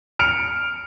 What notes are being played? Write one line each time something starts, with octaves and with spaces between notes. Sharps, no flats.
F6 C#7 D7 F7